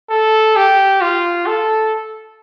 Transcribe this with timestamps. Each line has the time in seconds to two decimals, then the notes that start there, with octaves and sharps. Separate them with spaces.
0.11 A4
0.56 G4
1.01 F4
1.46 A4